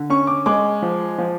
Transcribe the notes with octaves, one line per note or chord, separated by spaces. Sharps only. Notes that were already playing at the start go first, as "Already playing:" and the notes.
Already playing: D3
C#4 C#6
D6
G#3 D6
F3
F3